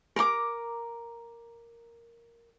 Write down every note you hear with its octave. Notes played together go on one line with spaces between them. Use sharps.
A#4 A#5 B5 D6